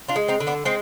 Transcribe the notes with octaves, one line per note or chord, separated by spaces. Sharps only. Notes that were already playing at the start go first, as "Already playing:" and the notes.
D4 F4
G#3
C4 D#4
D3
B3 D4
G#3 C4